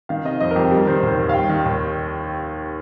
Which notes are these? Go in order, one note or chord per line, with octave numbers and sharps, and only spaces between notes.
D#3 F5
C3 D#5
F2 D#5
A#4
F2 G4
G3 A#4
D#3 C5
D#2
D#2
F5
G3 G5
D#3
D#2